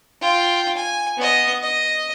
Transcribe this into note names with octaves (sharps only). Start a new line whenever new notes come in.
F4 G5
G#5
B3 D#5
D#5